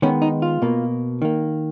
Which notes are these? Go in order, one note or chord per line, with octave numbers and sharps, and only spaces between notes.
D#3 G#3 B3 C#4
D#4
F4
B2 A#3
D#3 A#3